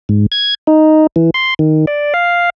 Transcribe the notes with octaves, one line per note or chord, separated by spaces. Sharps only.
G#2
G#6
D#4
E3
C6
D#3
D5
F5